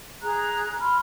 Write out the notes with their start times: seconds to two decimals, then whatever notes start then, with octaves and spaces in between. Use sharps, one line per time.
0.23 G#4 A#5 F#6
0.80 B5 C6 F6